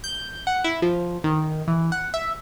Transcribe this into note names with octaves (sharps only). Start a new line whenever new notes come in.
G6
F#5
E4
F3
D#3
E3
F#5
E5